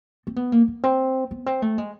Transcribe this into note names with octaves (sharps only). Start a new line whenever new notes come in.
C4
B3
A#3
A#3
C4
B3
C4
A3
G#3